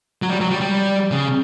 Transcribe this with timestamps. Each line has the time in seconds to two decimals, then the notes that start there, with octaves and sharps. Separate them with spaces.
0.22 F#3
0.29 G3
0.40 F#3
0.50 G3
0.61 G3
1.11 C#3